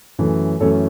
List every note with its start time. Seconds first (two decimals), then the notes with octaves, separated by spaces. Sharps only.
0.18 F#2 E3 A3 C#4
0.60 F#2 E3 A3 C#4 A4 C#5